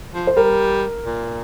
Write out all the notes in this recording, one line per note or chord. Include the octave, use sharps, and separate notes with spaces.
F3
C5
G3 A#4
A#2